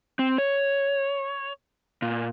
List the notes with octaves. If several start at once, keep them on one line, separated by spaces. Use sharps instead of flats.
C4
C#5
A#2